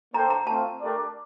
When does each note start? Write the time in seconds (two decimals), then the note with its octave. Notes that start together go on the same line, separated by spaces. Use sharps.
0.14 A#3 D4 A4 C5 G5 A#5
0.30 A#5
0.47 A3 C4 F4 A5
0.80 A3 D4 G4 A#4 D5